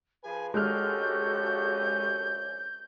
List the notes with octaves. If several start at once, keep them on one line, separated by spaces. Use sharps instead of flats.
F3 G#4 B4 G#5
A#1 G#3 C#4 F#4 G4 A4 F6 G6